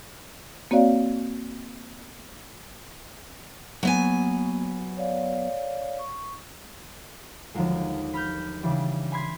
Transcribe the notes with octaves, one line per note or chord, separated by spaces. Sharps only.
A#3 C4 F#4 C#5 D5 F5
F#3 A#3 B3 G#5
C#5 D5 F5
C#6
D#2 D3 F3 F#3 G#3
B5 F6 G6
C#3 E3 G3 D4
G#5 B5 C6 G#6